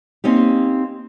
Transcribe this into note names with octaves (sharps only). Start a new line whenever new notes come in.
A#3 C4 C#4 D#4 G4